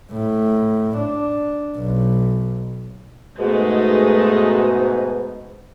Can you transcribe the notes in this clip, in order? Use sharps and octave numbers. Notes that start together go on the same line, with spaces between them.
A2
D4
B1
G#2 B2 G#3 A3 D#4